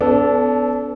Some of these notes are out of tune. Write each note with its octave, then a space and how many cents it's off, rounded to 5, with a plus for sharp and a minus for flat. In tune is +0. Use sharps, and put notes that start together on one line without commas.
B3 +20 D4 -40 A4 -10